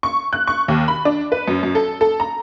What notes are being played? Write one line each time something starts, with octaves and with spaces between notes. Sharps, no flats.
C#6
F#6
C#6
D#2
B5
D4
B4
F#2
F#2
A4
A4
A#5